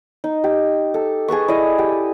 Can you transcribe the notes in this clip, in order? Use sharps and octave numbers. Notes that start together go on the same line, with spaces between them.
D#4
G4
A4
G#4 A4 B4 C#6
E4 D5 D#5
G4